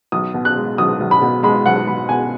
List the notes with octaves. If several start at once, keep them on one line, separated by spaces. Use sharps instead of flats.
B1 D#6
B2
F#6
G#3
B1 D#6
B1
B5
B2
G#3 B5
B1 F#5
B1 B5
B2 G#5